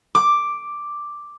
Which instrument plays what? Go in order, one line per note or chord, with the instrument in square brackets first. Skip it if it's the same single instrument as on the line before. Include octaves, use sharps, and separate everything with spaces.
[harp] D6